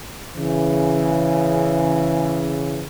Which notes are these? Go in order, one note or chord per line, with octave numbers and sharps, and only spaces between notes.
C#3 E3